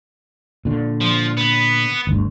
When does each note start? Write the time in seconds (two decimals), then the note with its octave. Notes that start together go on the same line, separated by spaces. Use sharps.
0.65 A#2 D3
1.01 F3
1.37 B3
2.07 G1 D2 G2